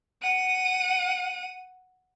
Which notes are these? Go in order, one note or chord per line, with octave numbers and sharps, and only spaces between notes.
F#5 D#7